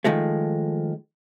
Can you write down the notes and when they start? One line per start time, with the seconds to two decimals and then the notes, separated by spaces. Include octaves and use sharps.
0.04 D#3 F3 G#3 A3